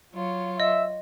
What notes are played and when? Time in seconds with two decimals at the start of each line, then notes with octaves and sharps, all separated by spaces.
0.12 F#3 F4 C#5
0.60 D#5 E5